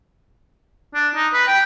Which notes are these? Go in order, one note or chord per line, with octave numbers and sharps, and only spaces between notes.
D4
D#4
B4
G5